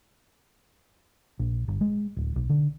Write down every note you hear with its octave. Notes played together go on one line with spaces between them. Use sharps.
A#1
G1
G#3
D1
B1
D3